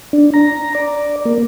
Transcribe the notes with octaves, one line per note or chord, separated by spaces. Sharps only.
D4
A#5
D5
A#3